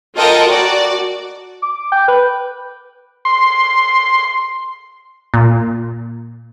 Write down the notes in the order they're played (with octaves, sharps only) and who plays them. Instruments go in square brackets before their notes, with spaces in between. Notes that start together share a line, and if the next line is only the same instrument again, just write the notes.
[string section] F4 A4 A#4 D#5 F#5 G5
F#4 D5
[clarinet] D6
G5
B4
[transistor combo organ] C6
[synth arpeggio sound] A#2